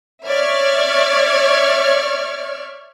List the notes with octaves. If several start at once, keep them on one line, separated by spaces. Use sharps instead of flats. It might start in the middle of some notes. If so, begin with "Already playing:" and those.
C#5 D5 E5 C#6 F6 G#6